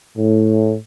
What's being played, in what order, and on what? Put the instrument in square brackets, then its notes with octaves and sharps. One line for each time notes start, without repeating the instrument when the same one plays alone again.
[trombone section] A2